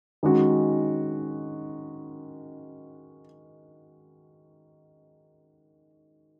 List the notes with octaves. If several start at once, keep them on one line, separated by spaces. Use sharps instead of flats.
D#3 G#3 C#4 F#4